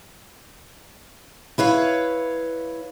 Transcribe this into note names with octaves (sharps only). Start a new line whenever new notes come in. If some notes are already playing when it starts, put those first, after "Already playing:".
E4 B4 C#5 F5